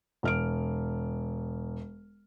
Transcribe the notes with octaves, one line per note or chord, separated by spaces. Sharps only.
E1 F6 D7